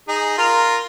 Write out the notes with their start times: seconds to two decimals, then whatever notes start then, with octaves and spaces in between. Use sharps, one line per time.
0.08 D#4 G#4
0.38 F4 A#4